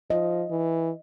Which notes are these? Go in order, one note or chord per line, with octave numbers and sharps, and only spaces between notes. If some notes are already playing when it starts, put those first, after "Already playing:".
F3 D#5
E3